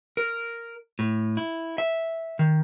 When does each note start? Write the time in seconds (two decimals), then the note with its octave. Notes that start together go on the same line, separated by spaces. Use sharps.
0.17 A#4
0.99 A2
1.37 E4
1.78 E5
2.39 D#3